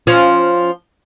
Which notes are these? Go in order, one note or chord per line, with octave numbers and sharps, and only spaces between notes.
F3 C#4